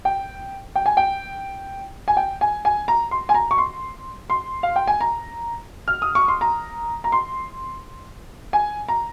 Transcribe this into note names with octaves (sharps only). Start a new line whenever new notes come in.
G5
G5
G#5
G5
G#5
G5
G#5
G#5
A#5
C6
G#5
A#5
C#6
C6
C6
F5
G5
G#5
A#5
F6
D#6
C#6
C6
A#5
A#5
C6
G#5
A#5